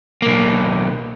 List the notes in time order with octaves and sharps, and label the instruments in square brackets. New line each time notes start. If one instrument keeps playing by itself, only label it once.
[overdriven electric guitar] B1 A#3